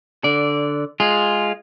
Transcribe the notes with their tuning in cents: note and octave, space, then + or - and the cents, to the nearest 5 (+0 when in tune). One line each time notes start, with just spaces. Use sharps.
D3 +0 D5 -15
G#3 +0 F4 +0 G#4 +0